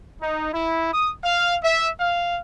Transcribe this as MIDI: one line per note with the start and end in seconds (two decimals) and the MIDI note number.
0.22 0.48 63
0.54 0.90 64
0.93 1.12 87
1.23 1.56 77
1.63 1.90 76
2.00 2.39 77